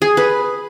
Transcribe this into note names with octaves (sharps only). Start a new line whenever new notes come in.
G#4
B4